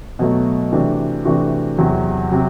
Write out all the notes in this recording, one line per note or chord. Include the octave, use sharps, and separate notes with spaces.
B2 F#3 A3
C3 E3 A3 D4 F#4
C3 E3 A3 D4 F#4
E2 C3 F#3
C3 F#3